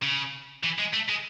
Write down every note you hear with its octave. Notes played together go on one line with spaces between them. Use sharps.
C#3
E3
G#3
A3
G#3